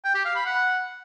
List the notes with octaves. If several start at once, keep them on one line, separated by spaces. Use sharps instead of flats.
G5
G4
F5
B5
F#5